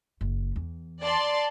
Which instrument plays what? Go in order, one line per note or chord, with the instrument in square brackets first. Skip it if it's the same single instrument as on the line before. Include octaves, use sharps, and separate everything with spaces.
[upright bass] F#1
E2
[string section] D5 A5 C6